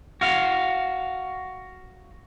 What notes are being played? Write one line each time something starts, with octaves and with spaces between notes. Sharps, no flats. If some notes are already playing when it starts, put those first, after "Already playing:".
F#4 F5